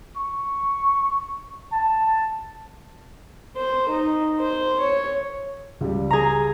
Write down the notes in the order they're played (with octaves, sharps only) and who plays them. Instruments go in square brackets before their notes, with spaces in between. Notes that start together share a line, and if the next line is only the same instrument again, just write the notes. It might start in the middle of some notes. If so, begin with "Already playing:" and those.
[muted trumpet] C#6
A5
[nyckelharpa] C5
D#4
C5
C#5
[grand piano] C#2 G3
[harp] G#4 A#5